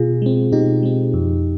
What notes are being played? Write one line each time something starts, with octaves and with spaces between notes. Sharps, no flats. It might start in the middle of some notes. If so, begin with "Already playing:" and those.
Already playing: B2 F4 G#4
G#3 C4
B2 D#4 G4
G#3 C4
F2